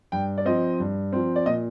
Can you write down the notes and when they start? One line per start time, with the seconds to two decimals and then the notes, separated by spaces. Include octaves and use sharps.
0.12 G2 G5
0.38 D5
0.45 F3 C4 D#5
0.80 G2
1.13 F3 C4
1.36 D5
1.46 A#2 D#5